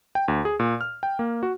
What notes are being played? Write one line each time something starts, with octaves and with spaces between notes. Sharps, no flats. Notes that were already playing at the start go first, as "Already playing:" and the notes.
G5
D2
G#4
A#2
F6
G5
A#3
F#4